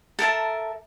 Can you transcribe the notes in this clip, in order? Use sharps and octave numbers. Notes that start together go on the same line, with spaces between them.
A4 A#4 E5 A5